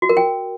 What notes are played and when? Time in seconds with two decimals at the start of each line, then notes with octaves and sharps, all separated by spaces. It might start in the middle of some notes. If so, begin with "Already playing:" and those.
0.02 F#4
0.09 A#4
0.17 G5